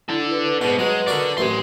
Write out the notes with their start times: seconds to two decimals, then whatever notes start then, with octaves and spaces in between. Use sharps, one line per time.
0.09 D4 E4 A4
0.31 B4
0.61 G#2 B2 D4
0.79 F#3 G#3
1.08 F#4 A4 A#4 D5 F#5
1.38 A1 F#2 C4 G#5 C6